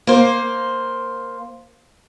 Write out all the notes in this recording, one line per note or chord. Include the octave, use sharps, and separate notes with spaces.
A#3 C5